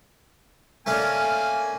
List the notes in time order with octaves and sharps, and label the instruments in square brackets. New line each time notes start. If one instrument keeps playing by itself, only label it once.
[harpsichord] A3 C#4 D4 [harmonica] A#3 G#5